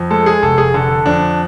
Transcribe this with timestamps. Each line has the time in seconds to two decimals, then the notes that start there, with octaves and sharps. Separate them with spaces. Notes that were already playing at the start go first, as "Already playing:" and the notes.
Already playing: F2
0.10 G#3 A4
0.26 G#4
0.42 F1 A4
0.58 G#4
0.74 D3 A4
1.06 F2 D4